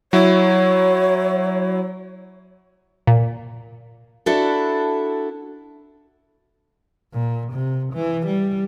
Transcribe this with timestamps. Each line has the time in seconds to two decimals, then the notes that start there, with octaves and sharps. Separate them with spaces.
0.13 F#3 E4 C#5
3.07 A#2
4.26 D4 E4 F#4 A4
7.13 A#2
7.53 C3
7.94 E3
8.27 G3